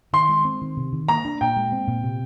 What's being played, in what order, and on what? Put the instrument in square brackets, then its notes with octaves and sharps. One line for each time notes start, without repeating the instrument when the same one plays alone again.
[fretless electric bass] D#3 [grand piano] C6
[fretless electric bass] G#3
C4
D#3
C3
D#3
[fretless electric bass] A#3 [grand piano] A#5
[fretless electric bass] D4
[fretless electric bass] A#2 [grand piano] G5
[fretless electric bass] G#3
C4
A#2
C3